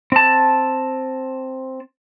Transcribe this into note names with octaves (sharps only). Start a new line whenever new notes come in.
C4 A5